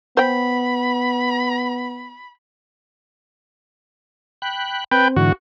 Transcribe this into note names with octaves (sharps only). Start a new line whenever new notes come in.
B3 C5 G5 B5
G5 B5 F#6
C4 B4 G5
G#2 D3 E3 F#4